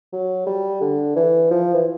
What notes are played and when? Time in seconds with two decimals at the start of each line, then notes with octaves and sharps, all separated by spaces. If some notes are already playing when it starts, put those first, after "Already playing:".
0.13 F#3
0.47 G3
0.81 D3
1.16 E3
1.51 F3
1.74 E3